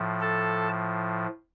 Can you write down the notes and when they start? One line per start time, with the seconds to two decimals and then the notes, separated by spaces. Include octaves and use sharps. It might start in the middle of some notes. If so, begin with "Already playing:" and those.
Already playing: A2 F3
0.21 A4 A5